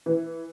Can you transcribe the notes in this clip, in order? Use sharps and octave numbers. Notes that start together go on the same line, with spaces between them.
E3